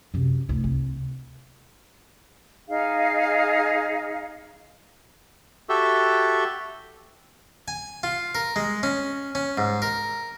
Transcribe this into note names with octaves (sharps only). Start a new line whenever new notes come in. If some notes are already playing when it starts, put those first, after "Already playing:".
F#2 C3
D2 E4
C2
D#4 G#4 F5
F#4 G4 A4 E5
G#5
F4
A#4
G#3
C#4
C#4
G#2
A#4